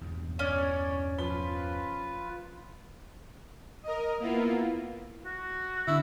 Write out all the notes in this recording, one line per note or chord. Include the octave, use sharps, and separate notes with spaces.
E2 G2 B2
C#4 C#5 D5
F3 F4 B4 B5 G7
A#4 D#5
A#3 B3 E4 F4
F#4
D3 D4 E4